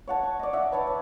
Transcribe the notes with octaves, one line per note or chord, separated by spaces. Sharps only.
C#5 F#5 A5
C#6
D5 D#5
E5 F#5
B4 C#5 F#5 A5
C#5